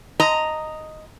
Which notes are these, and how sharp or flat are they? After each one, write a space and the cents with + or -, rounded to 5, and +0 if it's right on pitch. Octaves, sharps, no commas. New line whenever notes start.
D#5 +0 A#5 -10